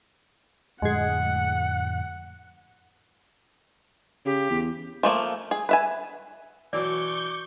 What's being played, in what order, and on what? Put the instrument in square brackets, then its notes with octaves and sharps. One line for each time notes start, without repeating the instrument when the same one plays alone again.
[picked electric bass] F2 A2 D3 [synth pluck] G#3 G#4 [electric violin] F#5
[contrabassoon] C#3 [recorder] G4
[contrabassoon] E2
[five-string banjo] F3 A3 A#3
G#4
B4 E5 G#5
[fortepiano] B2 E3 F#3 [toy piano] D5 [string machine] C#6 G6 [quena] D6